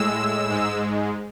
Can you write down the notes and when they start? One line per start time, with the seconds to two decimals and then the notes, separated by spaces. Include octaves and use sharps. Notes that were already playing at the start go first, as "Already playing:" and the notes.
Already playing: A2 G#3 E6
0.49 G#2 G#3